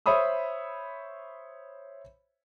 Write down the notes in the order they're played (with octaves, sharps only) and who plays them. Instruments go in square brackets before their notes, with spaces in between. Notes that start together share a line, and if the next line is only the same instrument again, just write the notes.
[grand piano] C5 C#5 E5 B5 D#6 E6